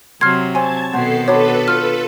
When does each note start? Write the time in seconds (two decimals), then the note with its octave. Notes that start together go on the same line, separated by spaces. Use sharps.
0.21 C3 F#3 C6 F6 G#6
0.55 C4 C#5 G#5 A5 G#6
0.93 B2 D#3 A4 C5 F#5 C7
1.28 D4 F#4 A4 B4 C#5 B5
1.68 F4 F6